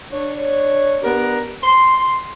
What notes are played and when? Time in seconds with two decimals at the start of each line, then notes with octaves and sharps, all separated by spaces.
0.13 D4 C#5
1.03 B3 D4 G4 A#4
1.63 C6